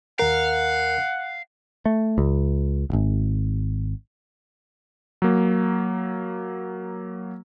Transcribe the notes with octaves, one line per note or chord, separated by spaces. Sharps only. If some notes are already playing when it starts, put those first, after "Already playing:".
D#2 A#4 F5 F#5
A3
C#2
D1 G#1
F#3 A#3